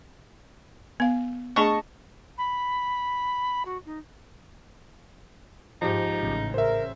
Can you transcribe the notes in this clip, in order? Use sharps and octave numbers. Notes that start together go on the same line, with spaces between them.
B3 F5
A3 D4 G#4 D#5 A5 C#6
B5
F#4
D#4
G#2 F3 D#4 G4
A1 C#3
A#4 C5 E5